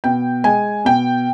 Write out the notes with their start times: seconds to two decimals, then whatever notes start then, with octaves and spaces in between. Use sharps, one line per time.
0.04 B2 G5
0.44 G#3 G#5
0.85 B2 G5